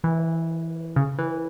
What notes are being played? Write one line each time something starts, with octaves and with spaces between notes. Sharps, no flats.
E3
C#3
E3